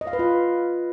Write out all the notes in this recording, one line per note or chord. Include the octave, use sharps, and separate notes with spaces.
D#5
F5
B4
F4